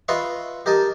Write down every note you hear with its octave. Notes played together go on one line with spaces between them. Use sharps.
F4 B4 D#5 E5 C6 C#6
G4 A#4 D#5 G#5 A5